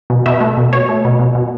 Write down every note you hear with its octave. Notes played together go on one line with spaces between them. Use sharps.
B2
B2 E5
A3
B2
B2 C#5
A3
B2
B2
B2